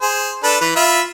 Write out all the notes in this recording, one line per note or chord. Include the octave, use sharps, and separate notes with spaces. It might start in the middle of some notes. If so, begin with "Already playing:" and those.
G#4 C5
D4 A4 B4
E3 B4
F4 E5 B5